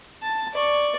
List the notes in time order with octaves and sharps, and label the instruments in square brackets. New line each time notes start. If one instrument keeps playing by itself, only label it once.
[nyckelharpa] A5
D5 C#6